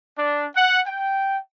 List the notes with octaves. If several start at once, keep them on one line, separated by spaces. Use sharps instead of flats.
D4
F#5
G5